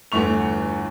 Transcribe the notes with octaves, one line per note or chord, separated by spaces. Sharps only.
G1 E2 A3 C#6 F7